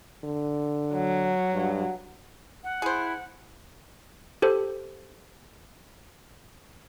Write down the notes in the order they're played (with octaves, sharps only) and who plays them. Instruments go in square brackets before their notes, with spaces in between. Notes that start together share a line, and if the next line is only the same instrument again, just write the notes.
[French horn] D3
[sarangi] F#3
[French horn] G2
[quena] F#5
[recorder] E4 [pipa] G#4 C5
[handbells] G4 A4 C5